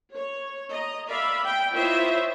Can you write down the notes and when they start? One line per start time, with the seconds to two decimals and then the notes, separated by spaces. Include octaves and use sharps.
0.14 C#5
0.71 D#5 A#5
1.09 D5 E5 F5 B5
1.44 G5
1.74 E4 F4 C5 C#5 D#5 E5